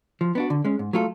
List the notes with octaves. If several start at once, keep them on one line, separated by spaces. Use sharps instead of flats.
F3
B3 D4 F#4
D3
G#3 C#4
G#2
F#3 A3 F4 A4